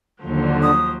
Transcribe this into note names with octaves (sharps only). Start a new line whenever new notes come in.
D#2 D3 F3 F#3
D#6